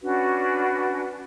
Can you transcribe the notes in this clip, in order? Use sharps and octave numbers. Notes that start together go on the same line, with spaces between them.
C#4 D4 F#4 B4